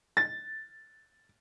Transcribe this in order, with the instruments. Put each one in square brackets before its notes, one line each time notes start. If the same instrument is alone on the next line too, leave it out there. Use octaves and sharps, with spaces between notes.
[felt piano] A6